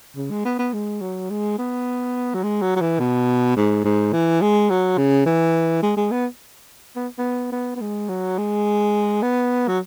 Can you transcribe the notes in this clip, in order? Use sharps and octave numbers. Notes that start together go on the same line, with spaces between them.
C#3
G#3
B3
B3
G#3
F#3
G#3
B3
F#3
G#3
F#3
F#3
E3
B2
G#2
G#2
E3
G#3
F#3
C#3
E3
G#3
G#3
B3
B3
B3
B3
B3
G#3
F#3
G#3
B3
F#3